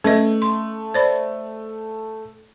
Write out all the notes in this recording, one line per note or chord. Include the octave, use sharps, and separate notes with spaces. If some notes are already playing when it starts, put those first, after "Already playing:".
A3 C#4 B4 D#5
C6
C5 D5 B5